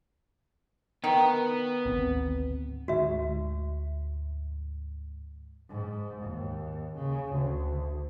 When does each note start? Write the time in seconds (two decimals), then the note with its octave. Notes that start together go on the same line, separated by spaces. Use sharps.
1.04 D#3 B3
1.86 G#1 D2 C4
2.88 D2 G#2 F#4 E5
5.69 G#2
6.23 D#2
6.95 C#3
7.34 D2